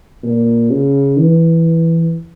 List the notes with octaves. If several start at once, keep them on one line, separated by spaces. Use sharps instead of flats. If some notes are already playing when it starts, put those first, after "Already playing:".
A#2
C#3
E3